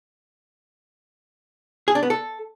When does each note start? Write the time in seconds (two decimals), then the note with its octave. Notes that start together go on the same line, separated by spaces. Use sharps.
1.88 G#4
1.95 D4
2.03 B3
2.10 A4